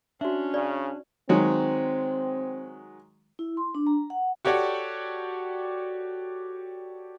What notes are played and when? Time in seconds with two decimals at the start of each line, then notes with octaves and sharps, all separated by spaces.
0.21 C#4 D4 F#4 E5
0.54 C#3 D5
1.29 D#3 F#3 G#3 C4
3.39 E4
3.57 C6
3.75 D4
3.87 A#5
4.10 F#5
4.45 F#4 G4 A4 C#5 D5 F#5